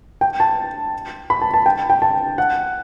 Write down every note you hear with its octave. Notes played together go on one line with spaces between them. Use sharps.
G5
A5
B5
A5
A5
G5
G5
A5
F#5